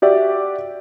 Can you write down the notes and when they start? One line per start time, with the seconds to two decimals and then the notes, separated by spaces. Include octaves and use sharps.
0.02 F#4 G4 D5 E5